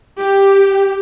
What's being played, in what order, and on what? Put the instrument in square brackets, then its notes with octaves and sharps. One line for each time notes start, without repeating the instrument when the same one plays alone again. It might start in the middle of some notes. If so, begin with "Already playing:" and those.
[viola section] G4